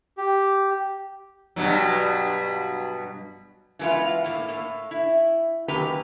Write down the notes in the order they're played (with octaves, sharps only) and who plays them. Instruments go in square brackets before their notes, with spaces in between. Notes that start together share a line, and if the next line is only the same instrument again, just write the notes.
[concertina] G4
[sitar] G2 B2 F#3
[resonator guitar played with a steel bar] E3 G#3 A3 B3 F4
A2 A#3
A2
E4
F#2 D#3 A#3 G4 B4 A#5